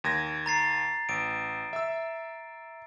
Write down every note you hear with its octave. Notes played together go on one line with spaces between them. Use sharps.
D#2 G#6 A#6
A#5 A6 C7
A1 D7
E5 E6